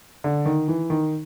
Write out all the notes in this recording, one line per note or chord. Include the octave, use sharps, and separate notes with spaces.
D3
D#3
E3
D#3